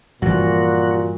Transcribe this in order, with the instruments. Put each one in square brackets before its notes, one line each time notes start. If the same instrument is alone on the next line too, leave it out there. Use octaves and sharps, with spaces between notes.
[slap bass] G2 E3 F3 [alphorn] A#2 [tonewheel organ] F#4